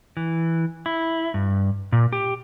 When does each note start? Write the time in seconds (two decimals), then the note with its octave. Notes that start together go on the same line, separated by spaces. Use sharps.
0.17 E3
0.86 E4
1.34 G2
1.92 A#2
2.13 G4